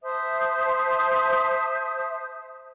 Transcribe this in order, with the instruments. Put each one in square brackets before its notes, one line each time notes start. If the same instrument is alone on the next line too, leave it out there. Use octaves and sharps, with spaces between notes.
[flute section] C5 E5 A5 D#6